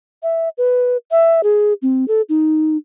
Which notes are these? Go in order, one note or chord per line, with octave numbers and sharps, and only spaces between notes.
E5
B4
E5
G#4
C4
A4
D#4